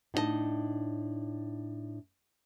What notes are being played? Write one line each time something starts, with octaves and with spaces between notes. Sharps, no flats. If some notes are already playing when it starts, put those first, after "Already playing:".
A2 D4 D#4 G#4 D#5 A5